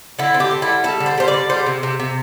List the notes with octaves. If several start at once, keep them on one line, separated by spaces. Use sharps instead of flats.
D3 E4
C4
G4
D3
E4
G3
G3 A4
D3
C5
G3 C5
D5
D3
G3 C5
C3
C3
C3